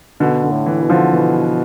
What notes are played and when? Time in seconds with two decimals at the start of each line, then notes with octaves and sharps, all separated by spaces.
0.20 B2 D3
0.43 D3
0.51 A2
0.66 E3
0.82 B2
0.90 D3 F3
1.12 B2 E3